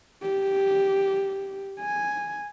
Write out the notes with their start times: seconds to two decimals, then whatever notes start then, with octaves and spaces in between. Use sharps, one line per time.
0.22 G4
1.80 G#5